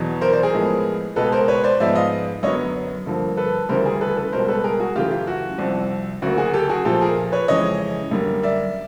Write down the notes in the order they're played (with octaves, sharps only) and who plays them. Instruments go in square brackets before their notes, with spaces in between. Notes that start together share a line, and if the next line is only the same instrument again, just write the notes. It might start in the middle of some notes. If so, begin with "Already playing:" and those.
Already playing: [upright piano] E2 B2 F#3 B3
A#4 C5
C5 D5
G#4 A#4
A2 F3 G#3 B3
C#2 B2 G#3 A4 B4
A#4 C5
B4 C#5
C5 D5
G#2 F3 G#3 B3 D5 E5
D#5 F5
F#2 D3 F#3 B3 C#5 D#5
G2 D3 F3 A#3
A4 B4
D2 C#3 E3 G3 A#4 C5
G#4 A#4
A4 B4
A4 B4
C#2 B2 G3 A#4 C5
A4 B4
G#4 A#4
F#4 G#4
F#2 C#3 E3 A3 F4 G4
F4 G4
F#4
C2 C3 F3
D2 C#3 F#3 A#3 F#4
F#4 G#4
G4 A4
F#4 G#4
A#2 F3 A3 G4 A4
G#4 A#4
B4 C#5
F2 C#3 E3 G#3 C#5 D#5
F#2 D3 G3 A#3
D5 E5